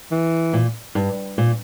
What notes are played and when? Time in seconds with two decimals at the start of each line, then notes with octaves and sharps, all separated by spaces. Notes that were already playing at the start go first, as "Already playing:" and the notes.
0.11 E3
0.53 A#2
0.95 G2
1.38 A#2